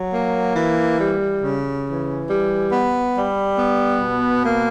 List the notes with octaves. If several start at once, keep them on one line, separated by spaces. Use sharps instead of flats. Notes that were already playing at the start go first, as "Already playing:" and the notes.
Already playing: F#3
A#3
E3
G3
C#3
E3
G3
B3
G3
B3
B2
A#3